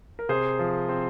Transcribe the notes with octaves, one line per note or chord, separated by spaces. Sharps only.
A#4
C3 G#4 C5
F3
C4